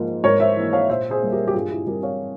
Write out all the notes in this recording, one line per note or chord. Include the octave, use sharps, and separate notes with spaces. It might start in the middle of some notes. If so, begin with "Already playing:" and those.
Already playing: G#2 F3 A#3
G#2 A#4 C#5
C5 E5
E3 A#3
C#5 F5
A#2 C5 E5
G#4 C5
G3 A#3
G4 A#4
G4
G2 F4 G#4
E4 G4
G3 C4 G4 A#4
C#5 F5